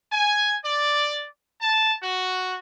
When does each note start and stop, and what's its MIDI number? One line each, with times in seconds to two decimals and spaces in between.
0.11 0.55 80
0.64 1.26 74
1.61 1.96 81
2.02 2.58 66